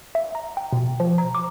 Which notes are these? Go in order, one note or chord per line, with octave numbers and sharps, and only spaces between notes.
E5
A#5
G5
B2
F3
A#5
D6